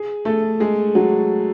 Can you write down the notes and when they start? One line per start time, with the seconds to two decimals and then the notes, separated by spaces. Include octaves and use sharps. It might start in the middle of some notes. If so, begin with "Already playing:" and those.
Already playing: G#4
0.25 A3 A4
0.60 G#3 G#4
0.95 F#3 F#4